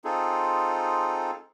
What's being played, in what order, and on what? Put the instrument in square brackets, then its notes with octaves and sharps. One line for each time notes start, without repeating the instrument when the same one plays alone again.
[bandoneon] C4 D#4 F4 G#4 A4